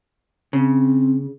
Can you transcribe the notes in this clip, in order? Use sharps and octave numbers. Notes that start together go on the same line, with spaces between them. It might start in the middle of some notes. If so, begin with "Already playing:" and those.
C#3 C4